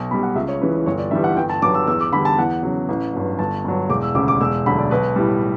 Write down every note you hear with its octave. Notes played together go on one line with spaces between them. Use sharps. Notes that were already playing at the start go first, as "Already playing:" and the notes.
Already playing: B1
B2 G3 B5
F#5
C#2 E5
C#5
C#3 E3 B4
C#5
G1 C#5
D5
G2 E3 G3 E5
F#5
G1 G5
A5
G2 F#3 D6
E6
E2 E6
D6
D3 G3 B5
A5
E2 F#5
C#3 F#3
A1
G2 F#3
G1 A5
G2 F#3
E1 D6
E6
D2 C#3 D6
D6
E1 E6
D2 D3 F#3 B5
D5
B1 B4
A2 G3